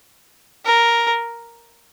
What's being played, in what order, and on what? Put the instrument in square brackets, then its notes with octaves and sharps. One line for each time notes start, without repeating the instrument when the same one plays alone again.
[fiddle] A#4